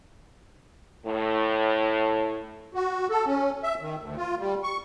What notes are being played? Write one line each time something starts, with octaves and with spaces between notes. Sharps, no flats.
A2
F#4
A4
C#4
E5
D#3
D2
F4
G3
C#6